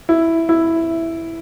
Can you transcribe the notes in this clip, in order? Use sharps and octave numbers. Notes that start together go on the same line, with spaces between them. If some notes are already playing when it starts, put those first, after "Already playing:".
E4
E4